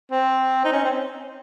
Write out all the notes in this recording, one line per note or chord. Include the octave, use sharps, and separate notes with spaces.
C4
D#4
C#4
C4